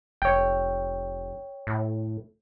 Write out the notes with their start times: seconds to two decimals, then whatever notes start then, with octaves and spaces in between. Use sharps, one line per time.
0.22 F1 C#5 G5
1.67 A2